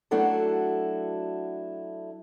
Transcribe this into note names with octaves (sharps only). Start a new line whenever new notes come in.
F#3 A3 D4 E4 F#4 A4